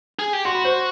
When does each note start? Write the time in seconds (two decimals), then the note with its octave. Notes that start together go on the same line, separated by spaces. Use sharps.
0.19 G#4
0.33 G4
0.45 F#4 C6
0.55 B5
0.64 C5 C6